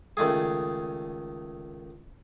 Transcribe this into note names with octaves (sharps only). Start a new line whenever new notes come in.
C#2 D#3 A3 G#4